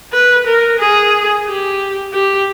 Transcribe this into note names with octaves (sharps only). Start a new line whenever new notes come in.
B4
A#4
G#4
G4
G4